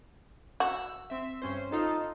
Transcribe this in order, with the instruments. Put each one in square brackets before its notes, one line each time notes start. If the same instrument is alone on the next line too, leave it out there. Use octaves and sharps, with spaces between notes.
[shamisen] F#4 [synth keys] E6
[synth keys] C4 E5
G2 C#4 C5
[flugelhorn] D#4 [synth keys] F4 A4